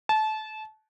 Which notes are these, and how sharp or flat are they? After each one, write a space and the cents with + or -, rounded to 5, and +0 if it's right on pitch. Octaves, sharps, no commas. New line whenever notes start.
A5 -25